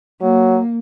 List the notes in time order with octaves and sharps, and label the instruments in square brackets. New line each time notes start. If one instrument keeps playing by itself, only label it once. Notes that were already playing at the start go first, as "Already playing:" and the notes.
[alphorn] F#3 [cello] A#3